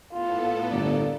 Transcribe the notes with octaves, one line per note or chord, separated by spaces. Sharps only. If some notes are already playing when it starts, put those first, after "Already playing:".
A2 B3 F4 A4
G1 A#3 D5